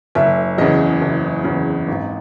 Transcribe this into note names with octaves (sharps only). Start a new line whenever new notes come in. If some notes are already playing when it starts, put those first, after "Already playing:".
F#1 E5
E2 C#3 D#5
F#1
E2 C#3
G#1